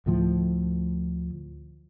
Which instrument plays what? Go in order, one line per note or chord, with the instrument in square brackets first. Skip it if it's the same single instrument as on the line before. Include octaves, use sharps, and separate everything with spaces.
[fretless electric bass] D2 A2 F3